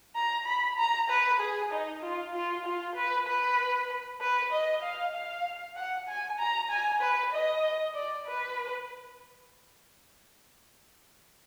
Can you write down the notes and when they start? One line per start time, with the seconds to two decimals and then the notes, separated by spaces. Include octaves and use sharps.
0.16 A#5
0.47 B5
0.78 A#5
1.10 B4
1.40 G#4
1.72 D#4
2.03 F4
2.34 F4
2.66 F4
2.96 B4
3.28 B4
4.21 B4
4.53 D#5
4.83 F5
5.14 F5
5.77 F#5
6.09 G#5
6.39 A#5
6.71 G#5
7.02 B4
7.33 D#5
7.94 D5
8.27 B4